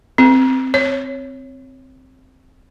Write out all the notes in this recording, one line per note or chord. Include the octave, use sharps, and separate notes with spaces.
C4
C#5